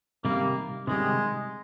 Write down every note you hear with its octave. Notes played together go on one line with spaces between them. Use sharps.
C3 D#3 G3 A#3
C3 D#3 G3 G#3